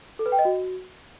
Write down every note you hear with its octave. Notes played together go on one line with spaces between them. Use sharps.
A4
B4
G5
D#5
F#4